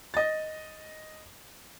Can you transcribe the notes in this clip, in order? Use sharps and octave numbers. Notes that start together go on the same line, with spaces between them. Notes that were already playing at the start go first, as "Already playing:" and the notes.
D#5 A6